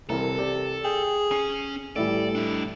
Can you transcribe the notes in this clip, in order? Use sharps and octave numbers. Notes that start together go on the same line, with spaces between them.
C2 C3 E3 A4 A#4
G4 D5
G#4 G5
C#4 G#5 C7
A2 E3 G3 A4 D5
D4 E4